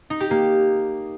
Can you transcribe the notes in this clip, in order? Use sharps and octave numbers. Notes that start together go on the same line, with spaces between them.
D#4
G4
A#3